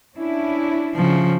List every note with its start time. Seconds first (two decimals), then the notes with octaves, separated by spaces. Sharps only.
0.15 C#4 D4 E4
0.95 C#3 F3